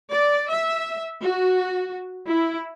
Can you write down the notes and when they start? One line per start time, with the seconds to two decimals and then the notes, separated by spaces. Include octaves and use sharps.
0.12 D5
0.51 E5
1.23 F#4
2.27 E4